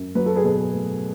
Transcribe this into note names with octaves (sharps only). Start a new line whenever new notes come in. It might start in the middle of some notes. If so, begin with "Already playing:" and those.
Already playing: F#2
F#3 B4
A4
G#4 B4
B2
A3